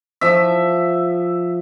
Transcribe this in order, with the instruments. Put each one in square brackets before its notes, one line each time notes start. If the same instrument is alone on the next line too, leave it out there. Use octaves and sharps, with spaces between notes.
[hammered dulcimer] F3 E5